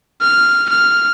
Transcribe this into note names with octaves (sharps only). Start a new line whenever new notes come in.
F6
F6